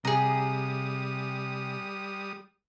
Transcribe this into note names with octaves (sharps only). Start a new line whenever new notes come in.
C3 G3 G4 G#4 A#5 D#6